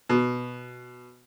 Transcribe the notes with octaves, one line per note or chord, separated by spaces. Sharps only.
B2